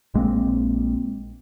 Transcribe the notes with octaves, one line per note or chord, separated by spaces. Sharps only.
A#1 G#3 A#3 C4